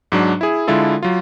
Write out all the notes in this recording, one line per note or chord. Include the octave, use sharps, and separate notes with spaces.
G#2 F#3 D4
E4 G#4
D3 G#3 E4 F4 A4
F#3 F4